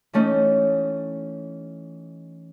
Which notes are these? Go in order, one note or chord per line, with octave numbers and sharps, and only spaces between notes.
E3 A3 C#4 D#4